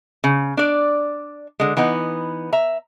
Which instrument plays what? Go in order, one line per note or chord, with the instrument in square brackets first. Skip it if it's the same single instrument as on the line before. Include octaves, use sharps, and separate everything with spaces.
[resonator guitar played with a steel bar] C#3
D4 D5
D3 G#3
E3 B3 D#4 B4
E5 A#5